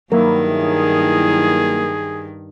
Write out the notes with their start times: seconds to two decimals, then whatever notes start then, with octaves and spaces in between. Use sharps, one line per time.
0.12 G2 D#3 F#3 A#3 E4 A#4
0.46 G#4